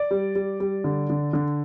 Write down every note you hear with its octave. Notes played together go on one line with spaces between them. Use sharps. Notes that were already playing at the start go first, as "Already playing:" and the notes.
Already playing: D5
G3
G3
G3
D3
D3
D3